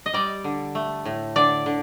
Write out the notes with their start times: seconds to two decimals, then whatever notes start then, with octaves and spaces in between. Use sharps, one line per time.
0.06 D#5
0.13 G3 D5
0.44 D3
0.75 A3
1.05 A2
1.36 D3 D5
1.66 D3